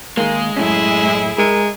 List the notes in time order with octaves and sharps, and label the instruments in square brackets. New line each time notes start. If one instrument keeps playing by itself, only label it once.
[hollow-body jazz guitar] D#3 A#3 [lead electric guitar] G#3
[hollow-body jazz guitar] F#2 A2 C#4 [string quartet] E4 G#4
[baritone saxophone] G#3 [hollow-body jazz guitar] A#4